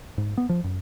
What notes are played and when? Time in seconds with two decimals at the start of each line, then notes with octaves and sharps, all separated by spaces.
0.18 G#2
0.37 B3
0.49 F3
0.64 F#2